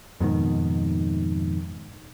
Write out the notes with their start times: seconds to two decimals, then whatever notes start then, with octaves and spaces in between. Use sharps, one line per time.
0.20 F2 G#2 B2 D#3